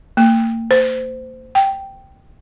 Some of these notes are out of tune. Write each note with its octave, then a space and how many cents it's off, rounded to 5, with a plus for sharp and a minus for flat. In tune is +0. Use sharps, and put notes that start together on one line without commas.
A#3 -40
C5 -20
G5 -5